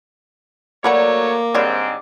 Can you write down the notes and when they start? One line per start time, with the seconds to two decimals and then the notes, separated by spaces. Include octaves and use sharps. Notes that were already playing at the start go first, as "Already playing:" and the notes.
0.84 F#3 A3 A#3 B4 C#5 D5 F#5 A#5
1.54 G#2 D3 G3 C4 C#5